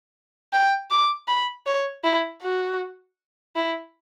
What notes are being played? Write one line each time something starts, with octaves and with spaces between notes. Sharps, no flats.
G5
D6
B5
C#5
E4
F#4
E4